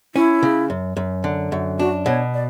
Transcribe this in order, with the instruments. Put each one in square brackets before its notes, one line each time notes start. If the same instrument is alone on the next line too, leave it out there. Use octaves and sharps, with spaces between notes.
[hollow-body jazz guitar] C#4 [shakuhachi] E4
[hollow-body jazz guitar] C#3
F#2
F#2
D3
F#2
[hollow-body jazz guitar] D4 [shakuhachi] F#4
[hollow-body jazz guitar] B2 [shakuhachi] C#5
[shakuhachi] D5